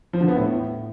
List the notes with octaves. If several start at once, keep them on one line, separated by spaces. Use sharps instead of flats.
F3
D3
B3
A2